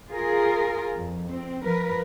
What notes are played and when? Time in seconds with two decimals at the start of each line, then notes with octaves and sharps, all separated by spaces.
0.11 F4 G#4 A#4
0.96 F2
1.29 C4
1.63 F3 A#4 B4